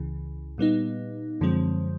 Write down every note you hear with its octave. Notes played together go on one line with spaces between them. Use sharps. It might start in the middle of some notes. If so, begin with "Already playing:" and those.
Already playing: C#2 C#3 E3
A#2 G3 B3 D#4
F#2 D3 F3 G#3 C4